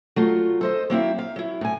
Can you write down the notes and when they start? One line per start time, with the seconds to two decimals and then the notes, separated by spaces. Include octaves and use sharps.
0.16 F#3 A3 F4
0.61 A4 C5 D#5
0.90 F#3 A#3 C4 E4
1.18 F5
1.36 F#3 E4
1.61 A2 G#5